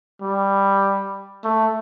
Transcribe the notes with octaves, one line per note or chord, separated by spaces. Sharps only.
G3
A3